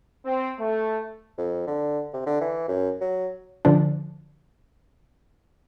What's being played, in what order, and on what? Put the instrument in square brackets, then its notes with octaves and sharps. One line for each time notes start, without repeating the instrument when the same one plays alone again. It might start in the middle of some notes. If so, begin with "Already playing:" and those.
[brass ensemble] C4
A3
[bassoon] F2
D3
C3
D3
E3
F#2
F#3
[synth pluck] D3 F3 D4